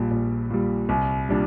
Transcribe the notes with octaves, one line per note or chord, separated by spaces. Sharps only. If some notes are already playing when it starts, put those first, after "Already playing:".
Already playing: A#1 A#2 G3
A#1
A#2 G3
C2
A#2 G3 D4